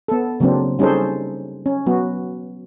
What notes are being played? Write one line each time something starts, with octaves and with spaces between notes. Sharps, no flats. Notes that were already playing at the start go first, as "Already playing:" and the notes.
B3 A4
C#3 F#3 A#3 C4 D4
G3 C#4 D#4 G#4 A4 C5
C#4
F#3 B3 F#4